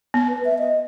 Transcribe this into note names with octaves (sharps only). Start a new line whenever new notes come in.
B3
B4
E5
D#5